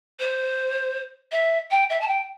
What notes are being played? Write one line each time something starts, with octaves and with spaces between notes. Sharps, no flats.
C5
E5
G5
E5
A5
G5